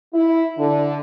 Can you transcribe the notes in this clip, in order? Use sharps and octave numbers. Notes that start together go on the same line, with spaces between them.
E4
D3